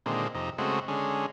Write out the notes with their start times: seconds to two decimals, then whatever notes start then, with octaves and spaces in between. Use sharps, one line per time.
0.06 A#2 D3 D#3 G#3 C4
0.35 F2 C3 D#4
0.58 C#3 G#3 A3 C4 F#4
0.88 D3 G#3 C#4